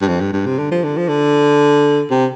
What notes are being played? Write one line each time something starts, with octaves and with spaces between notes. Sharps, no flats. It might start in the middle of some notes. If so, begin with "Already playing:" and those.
G2
F2
G2
G2
C3
D3
F3
D3
F3
D3
C3